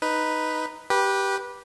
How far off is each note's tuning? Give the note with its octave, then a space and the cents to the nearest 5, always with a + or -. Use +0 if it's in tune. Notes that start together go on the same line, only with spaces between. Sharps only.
D#4 +0 B4 +0
G4 -5 B4 -20